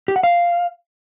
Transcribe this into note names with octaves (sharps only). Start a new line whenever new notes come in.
G4
F#5
F5